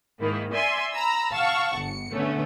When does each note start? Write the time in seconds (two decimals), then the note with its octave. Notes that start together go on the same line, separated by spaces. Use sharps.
0.20 G#2 D#3 A#3 E4
0.53 D5 E5 G#5 C6
0.93 A#5 B5 E6
1.32 F5 F#5 A5 C#6 E6
1.76 G1 C#7
2.12 D3 A3 B3 C#4